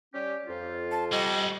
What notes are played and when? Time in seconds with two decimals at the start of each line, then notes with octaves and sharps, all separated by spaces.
0.14 G3 C#4 G4
0.47 F2 F4
0.92 A5
1.12 G3 G#3 F#4 D#5